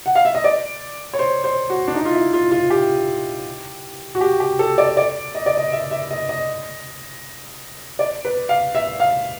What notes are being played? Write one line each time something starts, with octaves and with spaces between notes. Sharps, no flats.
F#5
F5
E5
D#5
D5
C#5
C5
C5
F#4
D4
D#4
F4
E4
F4
F4
G4
F#4
G4
G4
A4
D5
D5
D#5
D5
D#5
E5
E5
D#5
D#5
D5
B4
F5
E5
F5